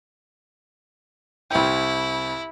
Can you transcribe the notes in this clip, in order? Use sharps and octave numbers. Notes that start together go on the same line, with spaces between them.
C2 E4 G5